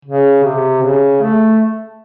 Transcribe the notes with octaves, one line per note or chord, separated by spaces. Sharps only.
C#3
C3
C#3
A3